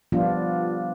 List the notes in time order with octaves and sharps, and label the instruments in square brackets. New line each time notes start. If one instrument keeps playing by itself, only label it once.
[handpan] F3 G3 B3 D4 F4